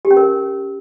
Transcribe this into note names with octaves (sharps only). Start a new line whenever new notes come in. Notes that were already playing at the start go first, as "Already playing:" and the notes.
G4
C#4
A#4